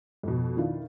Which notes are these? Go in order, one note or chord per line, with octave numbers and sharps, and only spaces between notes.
F2 B2
D#3 D4 E4 F4